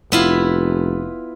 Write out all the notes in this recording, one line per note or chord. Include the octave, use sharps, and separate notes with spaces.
F1 B3 E4 F4